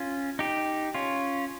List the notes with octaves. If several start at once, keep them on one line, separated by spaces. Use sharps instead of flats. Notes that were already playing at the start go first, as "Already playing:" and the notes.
Already playing: C#4 F4
D#4 G4
C#4 F4